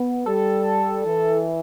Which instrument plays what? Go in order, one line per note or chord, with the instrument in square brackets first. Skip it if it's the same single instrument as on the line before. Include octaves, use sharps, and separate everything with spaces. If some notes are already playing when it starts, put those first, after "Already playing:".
Already playing: [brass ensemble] B3
[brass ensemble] G3 [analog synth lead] A4
[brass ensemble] E3